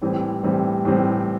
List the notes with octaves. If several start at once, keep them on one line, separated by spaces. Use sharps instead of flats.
A2 E3 G3 C4
A2 E3 G3 C4
A2 E3 G3 C4